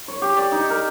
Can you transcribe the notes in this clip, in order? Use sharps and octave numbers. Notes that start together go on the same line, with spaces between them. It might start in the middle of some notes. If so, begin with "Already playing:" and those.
C#5
G4
D5
D#4
A#4